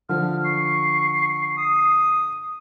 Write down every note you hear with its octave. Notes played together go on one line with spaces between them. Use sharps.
D3 F3 F6
C#6 C7
D#6